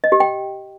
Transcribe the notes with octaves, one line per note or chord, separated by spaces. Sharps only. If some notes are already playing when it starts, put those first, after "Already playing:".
D#5
G4
G5